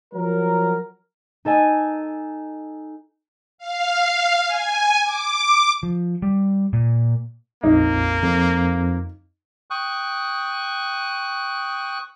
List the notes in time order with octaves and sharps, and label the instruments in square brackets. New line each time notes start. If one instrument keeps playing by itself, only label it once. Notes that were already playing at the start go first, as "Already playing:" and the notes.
[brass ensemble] F3 F#3 A#4
[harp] D#4 A4 D#5 G#5
[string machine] F5
G#5
D6
[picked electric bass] F3
G3
A#2
[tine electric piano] A#1 F2 [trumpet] A#3 [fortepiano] D#4
[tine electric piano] F2
[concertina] G5 C#6 D#6 F#6